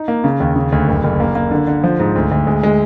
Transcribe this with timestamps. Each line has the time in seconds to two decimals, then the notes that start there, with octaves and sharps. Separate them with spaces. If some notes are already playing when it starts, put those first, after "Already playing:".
Already playing: D#4
0.08 A#3
0.24 C#3
0.40 D#2
0.56 C#3
0.72 D2
0.88 F#1
1.04 F#1
1.20 A#3
1.35 A#3
1.51 D3
1.67 D3
1.84 F3
2.00 G#2
2.16 D2
2.31 D2
2.47 G#3
2.63 G#3